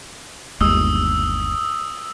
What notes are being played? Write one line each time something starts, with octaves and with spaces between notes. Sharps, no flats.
G1 D#2 G#3 D#6 E6